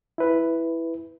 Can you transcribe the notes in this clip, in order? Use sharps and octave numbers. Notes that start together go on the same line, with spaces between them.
E4 B4